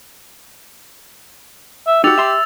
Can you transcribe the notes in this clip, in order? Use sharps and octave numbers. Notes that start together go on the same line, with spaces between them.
E5
D#4 F#4 G4 E6 A6 F7
E5 C6